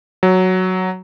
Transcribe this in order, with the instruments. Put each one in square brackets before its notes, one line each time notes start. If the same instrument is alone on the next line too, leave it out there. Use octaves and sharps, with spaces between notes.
[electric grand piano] F#3